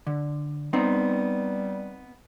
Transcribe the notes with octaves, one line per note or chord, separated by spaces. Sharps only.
D3
G3 B3 C4 D#4